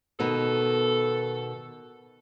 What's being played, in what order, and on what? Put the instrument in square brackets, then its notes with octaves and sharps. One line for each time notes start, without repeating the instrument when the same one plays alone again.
[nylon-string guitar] B2 D#3 D#4 [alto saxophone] A4